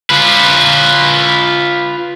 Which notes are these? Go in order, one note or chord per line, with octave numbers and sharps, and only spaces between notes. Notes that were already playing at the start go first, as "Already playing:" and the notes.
F4 B4